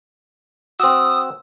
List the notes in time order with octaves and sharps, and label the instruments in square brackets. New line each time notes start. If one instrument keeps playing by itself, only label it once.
[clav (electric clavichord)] C4 F#4 [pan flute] D#6 [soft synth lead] E6